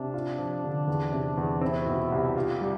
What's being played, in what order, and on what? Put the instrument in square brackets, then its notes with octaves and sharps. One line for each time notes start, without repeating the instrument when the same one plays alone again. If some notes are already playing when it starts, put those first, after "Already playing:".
Already playing: [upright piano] C3 [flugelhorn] D4
[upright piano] F4
F3
D3
E2
C3
E2
[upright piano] C4 [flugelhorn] E4
[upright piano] B2
C2
[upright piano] F4 [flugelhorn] G4
[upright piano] G3